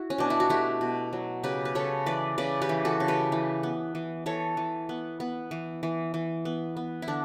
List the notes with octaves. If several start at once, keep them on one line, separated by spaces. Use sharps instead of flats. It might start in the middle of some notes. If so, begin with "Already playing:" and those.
Already playing: E4 F#4
C#4
B2 D4
E4
F#4
A3 E4 G4
B2
F#3
C#3 G4 B4
B4
C#3 A4 C#5
E3 B4 D5
C#3 B4 D5
G4 B4
E3
F#4 A4
C#3
G4 B4
E3
B3
E3
E3 A4 C#5
E3
B3
B3
E3
E3
E3
B3
B3
E4
D3 D4